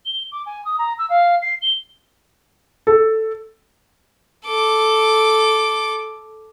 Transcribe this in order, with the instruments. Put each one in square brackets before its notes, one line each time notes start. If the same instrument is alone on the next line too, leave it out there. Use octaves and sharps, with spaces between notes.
[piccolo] G7
D6
G#5
D#6
A#5
E6
F5
C7
G7
[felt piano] A4
[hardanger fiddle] A4 D6